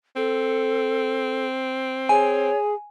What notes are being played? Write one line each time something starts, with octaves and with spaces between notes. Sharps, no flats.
C4 A4
G#4 C#5 G#5